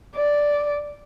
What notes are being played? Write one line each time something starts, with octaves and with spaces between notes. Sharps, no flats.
D5